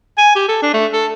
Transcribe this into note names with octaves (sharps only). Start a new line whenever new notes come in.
G#5
G4
A4
D4
A3
A4